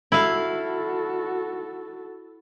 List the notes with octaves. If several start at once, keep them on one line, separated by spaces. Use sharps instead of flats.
E4 F#4 A4 F5